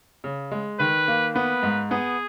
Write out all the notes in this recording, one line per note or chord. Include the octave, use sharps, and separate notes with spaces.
C#3
G#3
D#3 B4
A#3
B3 B4
G#2
B3 G#4